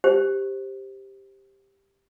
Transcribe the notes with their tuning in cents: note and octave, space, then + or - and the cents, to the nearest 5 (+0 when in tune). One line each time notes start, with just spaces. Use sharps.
G4 +5 C5 +10